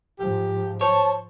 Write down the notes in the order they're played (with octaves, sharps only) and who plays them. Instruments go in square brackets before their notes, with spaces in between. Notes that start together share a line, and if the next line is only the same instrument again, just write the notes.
[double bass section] G#2 F3 [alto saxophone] G4
[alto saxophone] C5 [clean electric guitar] C#5 [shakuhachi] A5